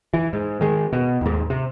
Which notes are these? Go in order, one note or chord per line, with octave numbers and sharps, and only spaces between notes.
E3
G#2
D#3 G#3
B2
D#2 G#2
C3